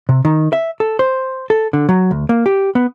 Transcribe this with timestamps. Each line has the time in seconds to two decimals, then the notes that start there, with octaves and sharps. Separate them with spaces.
0.09 C3
0.25 D#3
0.53 E5
0.80 A4
0.99 C5
1.50 A4
1.73 D3
1.89 F#3
2.11 D2
2.29 A#3
2.46 G4
2.75 B3